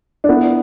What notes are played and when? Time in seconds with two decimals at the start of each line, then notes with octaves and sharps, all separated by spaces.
0.24 D4
0.28 B3 E4